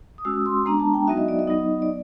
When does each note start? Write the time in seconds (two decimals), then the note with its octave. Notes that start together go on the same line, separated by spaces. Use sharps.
0.18 D#6
0.25 G#3 C#4 F#4 E6
0.46 C6
0.66 G#3 B3 D4 A#5
0.80 A5
0.94 G5
1.07 F#3 B3 D#4 F#4 E5
1.17 D#5
1.28 D5
1.39 D#5
1.47 F#3 B3 D#4
1.82 D5